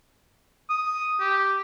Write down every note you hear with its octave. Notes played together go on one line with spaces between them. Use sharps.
D#6
G4